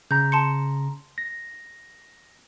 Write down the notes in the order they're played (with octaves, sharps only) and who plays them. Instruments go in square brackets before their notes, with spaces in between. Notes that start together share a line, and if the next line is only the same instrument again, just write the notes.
[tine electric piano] C#3 A#5 [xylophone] G6
[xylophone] A5 C6 C#7
[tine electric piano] A#6